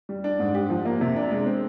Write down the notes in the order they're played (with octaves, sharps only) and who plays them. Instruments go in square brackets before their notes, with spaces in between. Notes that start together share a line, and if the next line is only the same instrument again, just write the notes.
[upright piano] G3
D4
G#2
G4
F3
A#3
C3
D4
G#3
C4